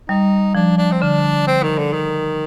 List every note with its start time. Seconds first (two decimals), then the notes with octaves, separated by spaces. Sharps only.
0.09 G3 D#4
0.55 F3 D4
0.78 D4
0.92 C4
1.02 D3 D4
1.47 C4
1.63 D#3
1.78 D3
1.93 D#3